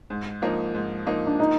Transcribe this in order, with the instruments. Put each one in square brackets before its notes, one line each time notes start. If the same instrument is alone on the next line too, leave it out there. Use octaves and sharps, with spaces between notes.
[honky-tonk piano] G#2
F3 A#3 D#4
G#2
F3 A#3 D#4
[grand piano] D4
D#4